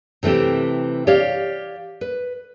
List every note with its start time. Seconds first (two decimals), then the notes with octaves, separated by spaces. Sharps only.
0.23 C3 E3 A3 C4 G4
1.07 G4 C#5 D5 F5
2.01 B4